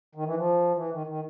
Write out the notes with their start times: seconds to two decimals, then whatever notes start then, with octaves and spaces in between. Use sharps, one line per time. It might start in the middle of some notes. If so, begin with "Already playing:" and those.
0.15 D#3
0.26 E3
0.36 F3
0.76 E3
0.92 D#3
1.07 D#3